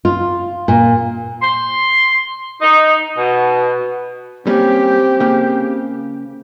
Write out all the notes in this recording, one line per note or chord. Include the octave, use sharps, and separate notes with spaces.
F4
A#2
C6
D#4
B2
G3 A#3 C4 C#4 G4
C#3 A#3